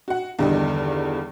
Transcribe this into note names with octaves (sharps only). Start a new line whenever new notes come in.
F#4 F#5
E2 G2 D3 D#3 G3 D#4